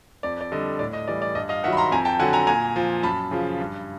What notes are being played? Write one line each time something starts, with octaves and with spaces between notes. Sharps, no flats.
F2 D5
D5
D3 G3 D#5
A2 D5
D#5
E3 G3 D5
D5
G2 D#5
D#5 F5
D#3 F#3 E5 F#5 B5
A#5 C6
F2 G#5 A#5
G5 A5
D3 F#3 F#5 G#5
G#5 A#5
A#2 G#5 A#5
F3
F#2 A5 B5
C#3 F3
G2